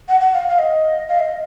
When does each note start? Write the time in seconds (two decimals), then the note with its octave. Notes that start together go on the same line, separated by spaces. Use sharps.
0.09 F#5
0.20 F#5
0.33 F5
0.48 F5
0.59 D#5
1.09 F5
1.20 D#5